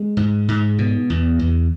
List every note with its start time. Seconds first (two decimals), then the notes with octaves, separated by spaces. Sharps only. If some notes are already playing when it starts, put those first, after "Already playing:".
Already playing: G#3
0.17 G#2
0.48 G#2
0.78 B2
1.10 E2
1.39 E2